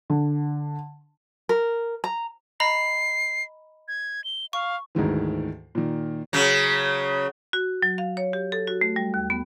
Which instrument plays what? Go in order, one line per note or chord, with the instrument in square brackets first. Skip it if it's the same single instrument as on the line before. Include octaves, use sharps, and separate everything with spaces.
[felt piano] D3
[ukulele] A#4
A#5
[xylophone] D#5 A#5 B5 [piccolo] C7
[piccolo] G#6
G7
[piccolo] F5 [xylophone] C#6
[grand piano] D2 G#2 D#3 E3
A#2 D#3
[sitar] C#3 F#3
[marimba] F#4
F#3
F5
C#5
G4
A4
F#4
A3
G3
D#2
B3